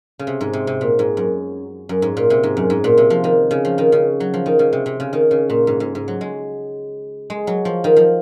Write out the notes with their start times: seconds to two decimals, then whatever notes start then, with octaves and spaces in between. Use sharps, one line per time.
0.19 C#3
0.27 C3
0.41 G#2
0.53 C3
0.67 C3
0.81 A#2
0.99 G#2
1.17 F#2
1.89 F#2
2.02 G#2
2.17 A#2
2.30 C3
2.43 G#2
2.57 F#2
2.70 G#2
2.84 A#2
2.98 C3
3.10 F3
3.24 D#3
3.51 C#3
3.65 F3
3.78 D#3
3.92 C#3
4.20 F#3
4.34 F3
4.46 D#3
4.59 C#3
4.73 C3
4.86 C3
5.00 C#3
5.13 D#3
5.31 C#3
5.50 A#2
5.67 G#2
5.80 G#2
5.95 G#2
6.08 F#3
6.21 G#3
7.30 G#3
7.47 F#3
7.65 F3
7.84 D#3
7.96 F3